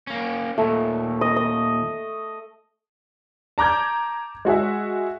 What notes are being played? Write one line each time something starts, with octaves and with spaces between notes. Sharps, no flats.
A#3 C#4
D#2 A#2 A3
D#5
D#5
A5 A#5 D6 G6 G#6
G#3 F#4 G#4 E5